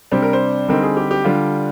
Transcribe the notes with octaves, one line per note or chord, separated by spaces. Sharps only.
C3 G3 D4 C5
A#4
C5
D3 G3 C4 D#4 A#4
G#4
G4
G4
D3 G3 D4 F4